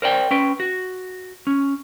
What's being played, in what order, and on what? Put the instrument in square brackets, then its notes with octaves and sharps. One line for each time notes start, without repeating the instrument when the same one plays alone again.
[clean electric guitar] A#4 C5 D5 G5
C#4 B4 G5
F#4
C#4